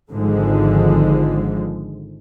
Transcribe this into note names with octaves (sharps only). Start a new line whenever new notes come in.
G#1 G#2 D3 F3 G#3